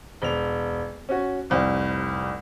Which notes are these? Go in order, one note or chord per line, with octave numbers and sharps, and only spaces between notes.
E1 F7
C#4 F#4
F1 C2